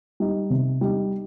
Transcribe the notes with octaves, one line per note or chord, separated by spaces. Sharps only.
G3 D#4
C3
G3 D#4